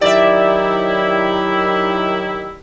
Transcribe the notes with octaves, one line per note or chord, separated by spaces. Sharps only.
D#3 F#3 E4 G4 D5 E5